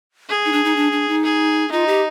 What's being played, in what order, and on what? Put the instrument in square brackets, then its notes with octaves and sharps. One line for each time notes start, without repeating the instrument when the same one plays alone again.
[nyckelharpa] G#4
[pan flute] D#4
D4
D#4
D4
D4
D#4
[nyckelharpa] G#4
[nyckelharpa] D#4 [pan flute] F4
[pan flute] G4